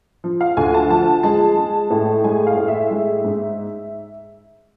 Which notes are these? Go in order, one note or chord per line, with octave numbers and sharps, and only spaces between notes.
F3
F5
D2 G#5
A5
F3 A5
G#3 A5
G#3
A2
G#3 G#5
F5
A2
E5
G#3
G#2